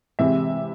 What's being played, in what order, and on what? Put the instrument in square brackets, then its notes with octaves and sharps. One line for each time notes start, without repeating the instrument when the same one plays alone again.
[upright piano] C3 E3 G#3 E5